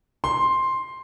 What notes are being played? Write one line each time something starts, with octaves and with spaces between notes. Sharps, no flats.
C6